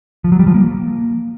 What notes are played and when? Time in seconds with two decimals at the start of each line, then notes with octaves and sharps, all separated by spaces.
0.24 F3
0.32 F#3
0.39 G3
0.47 F3
0.54 A#3